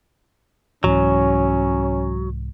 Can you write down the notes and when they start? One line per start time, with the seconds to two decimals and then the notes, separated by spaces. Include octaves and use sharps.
0.84 C2 G#2 E3 F#3 C#4